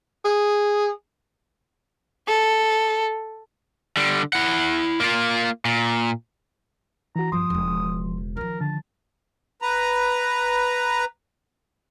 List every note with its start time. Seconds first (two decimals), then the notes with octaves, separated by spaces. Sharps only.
0.25 G#4
2.28 A4
3.97 D3 G3
4.33 E4 F#5
5.00 A#3 F4
5.65 A#2
7.16 E3 F#4 A#5
7.32 G1 F3 C6 D#6
7.50 E1 C#3
8.37 D#3 F3 A#4
8.61 D3 A5
9.62 B4 A#5